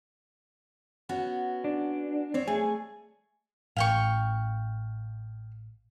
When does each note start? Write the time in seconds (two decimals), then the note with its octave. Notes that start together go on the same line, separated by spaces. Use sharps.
1.09 B3 C#4 F#4
1.64 D4
2.34 C4 C#5 D5
2.48 A3 G#4
3.76 A1 F5 G5 C#6